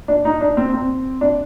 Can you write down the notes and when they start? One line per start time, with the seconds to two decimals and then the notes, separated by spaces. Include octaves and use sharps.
0.08 D4
0.25 D#4
0.41 D4
0.57 C4
0.73 C4
1.21 D4